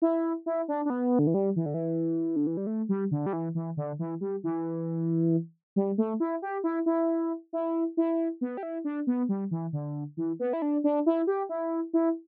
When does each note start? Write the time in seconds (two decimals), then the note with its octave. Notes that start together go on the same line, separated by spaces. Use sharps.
0.02 E4
0.46 E4
0.68 D4
0.85 D4
0.90 B3
1.19 D3
1.27 E3
1.34 G3
1.56 E3
1.66 D3
1.74 E3
2.36 D3
2.47 E3
2.57 G3
2.67 A3
2.89 G3
3.11 D3
3.26 G3
3.33 E3
3.55 E3
3.77 D3
3.99 E3
4.21 G3
4.44 E3
5.76 G3
5.98 A3
6.20 E4
6.42 G4
6.64 E4
6.86 E4
7.53 E4
7.97 E4
8.41 B3
8.57 G4
8.63 E4
8.84 D4
9.07 B3
9.29 G3
9.51 E3
9.73 D3
10.17 E3
10.40 B3
10.53 E4
10.62 D4
10.84 D4
11.06 E4
11.27 G4
11.49 E4
11.93 E4